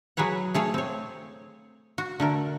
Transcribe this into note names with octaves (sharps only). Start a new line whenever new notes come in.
F#3 G#4 B4 C#5 F#5
A3 G#4 C#5 F5
C4 C#5
F#4
D3 A3 A#4